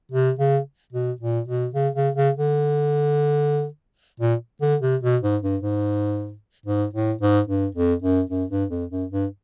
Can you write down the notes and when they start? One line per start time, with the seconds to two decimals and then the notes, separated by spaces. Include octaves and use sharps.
0.12 C3
0.39 C#3
0.93 B2
1.21 A#2
1.47 B2
1.74 C#3
1.95 C#3
2.16 C#3
2.37 D3
4.20 A#2
4.61 D3
4.82 C3
5.03 B2
5.22 G#2
5.43 G2
5.63 G#2
6.66 G#2
6.93 A2
7.21 G#2
7.47 G2
7.75 F2
8.02 F#2
8.30 F#2
8.50 G2
8.70 F2
8.90 F#2
9.11 G2